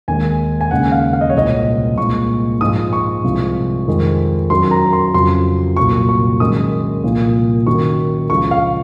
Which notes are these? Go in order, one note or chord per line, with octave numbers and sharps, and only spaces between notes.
D#2 D#3 G#3 G#5
G#5
D#2 C#3 G#3 F#5
F5
F5
D#5
C#5
C2 A#2 G#3 D#5
C2 A#2 G#3 C#6
G#2 F3 G#3 D#6
C#6
C2 C3 F3 G#3
F2 D#3 G#3
F#2 D#3 F#3 C6
A#5
C6
F2 C#3 F#3 C6
C2 A#2 F#3 C#6
C#6
F#2 D#3 G#3 D#6
C2 A#2 F3
F#2 D#3 F#3 C#6
C#2 C#3 F3 G#3 C#6
F5